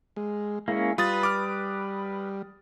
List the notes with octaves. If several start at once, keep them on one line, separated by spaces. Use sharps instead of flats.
G#3
G#3 A#3 C#4 E4
G3 F4 B4 D#6 A6
D6 F6